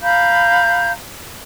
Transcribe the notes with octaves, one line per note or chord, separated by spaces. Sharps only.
F5 A#5 B5 G6